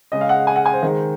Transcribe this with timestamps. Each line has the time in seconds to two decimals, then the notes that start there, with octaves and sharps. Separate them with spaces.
0.12 C#3 G#3 D#5
0.21 F5
0.29 F#5
0.47 G#5
0.56 F#5
0.66 G#5
0.73 C5
0.83 D#3 G#3